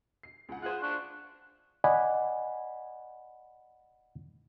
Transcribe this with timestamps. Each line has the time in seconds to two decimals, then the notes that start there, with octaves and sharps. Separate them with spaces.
0.23 C7
0.49 C#2 F#5
0.62 F4 G#4 C5 F#5
0.82 D4 C#6 F#6
1.84 D5 D#5 F#5 G#5 B5